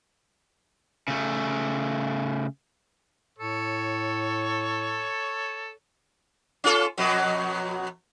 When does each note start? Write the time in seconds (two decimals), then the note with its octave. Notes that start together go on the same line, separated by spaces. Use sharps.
1.08 C#3 A3
3.39 A2 A4 C#5
6.64 C#4 F4 A4
6.97 F2 B2 F#3